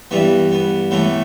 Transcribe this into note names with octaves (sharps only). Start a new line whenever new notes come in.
G2 E3 G3 B3
B3
A2 E3 A3 B3